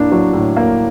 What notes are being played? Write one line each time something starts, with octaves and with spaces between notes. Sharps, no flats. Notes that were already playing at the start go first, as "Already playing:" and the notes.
Already playing: A2 A#3 D4
F#3
A2
A#3